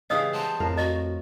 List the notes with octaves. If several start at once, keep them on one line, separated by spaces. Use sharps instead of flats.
C#3 E3 G4 D#5 F5 D#6 E6
B3 C5 A5
F2 A2 A#4 F5
F#4 D#5